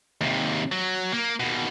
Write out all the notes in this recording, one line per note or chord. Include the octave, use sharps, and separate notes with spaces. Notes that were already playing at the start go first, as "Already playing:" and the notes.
D#2 C3
F#3
A#3
D#2 B2